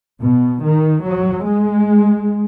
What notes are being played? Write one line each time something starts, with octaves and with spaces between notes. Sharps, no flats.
B2
D#3
F#3
G#3